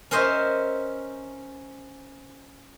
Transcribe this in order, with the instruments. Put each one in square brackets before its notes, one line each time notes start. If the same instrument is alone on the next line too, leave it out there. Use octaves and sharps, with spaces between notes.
[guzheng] C#4 A#4 C5 D#5 E5